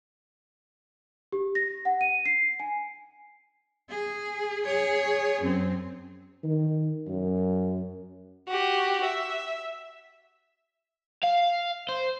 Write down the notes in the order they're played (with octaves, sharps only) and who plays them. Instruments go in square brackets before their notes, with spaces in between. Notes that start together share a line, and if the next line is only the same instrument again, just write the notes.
[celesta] G4
A#6
F#5
D#7
C7
G#5
[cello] G#4
G#4 C#5
F#2 C4
[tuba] D#3
F#2
[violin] F#4 G4
E5
[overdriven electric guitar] F5
C5